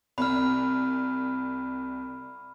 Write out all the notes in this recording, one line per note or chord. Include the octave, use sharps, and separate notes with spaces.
C2 B5 F6